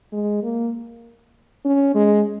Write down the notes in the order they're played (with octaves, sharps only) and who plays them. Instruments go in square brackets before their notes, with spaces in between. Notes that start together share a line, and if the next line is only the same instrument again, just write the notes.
[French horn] G#3
A#3
C#4
G#3